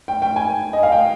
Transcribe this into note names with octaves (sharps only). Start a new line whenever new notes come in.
G5
G5
G#5
D#5
F5
G5